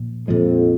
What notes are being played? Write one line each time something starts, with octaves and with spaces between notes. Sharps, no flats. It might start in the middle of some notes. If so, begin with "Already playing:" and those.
Already playing: A#2 F3
F2 A#2 F3 G#3